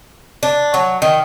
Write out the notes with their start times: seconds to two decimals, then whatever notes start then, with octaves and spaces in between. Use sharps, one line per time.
0.43 D4
0.74 F#3
1.02 D#3